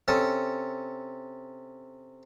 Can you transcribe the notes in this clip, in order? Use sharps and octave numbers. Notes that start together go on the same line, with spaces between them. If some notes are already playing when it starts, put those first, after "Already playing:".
C3 C#4 A4 D#6